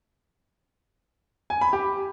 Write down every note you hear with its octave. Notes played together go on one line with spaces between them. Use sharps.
G#5
B5
G4